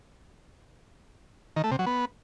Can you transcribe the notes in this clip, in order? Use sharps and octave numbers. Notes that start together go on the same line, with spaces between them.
D#3
A3
C3
F#3
B3